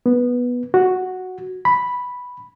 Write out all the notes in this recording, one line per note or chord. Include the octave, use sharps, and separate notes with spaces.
B3
F#4
B5